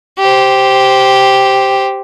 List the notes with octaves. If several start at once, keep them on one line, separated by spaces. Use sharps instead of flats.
G4 C5